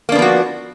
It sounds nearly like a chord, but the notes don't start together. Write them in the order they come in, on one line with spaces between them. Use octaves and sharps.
A#3 D4 B3 F3 F#4